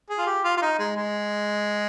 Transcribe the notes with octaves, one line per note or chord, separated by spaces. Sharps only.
G#4
F4
G4
F4
F4
D#4
G#3
G#3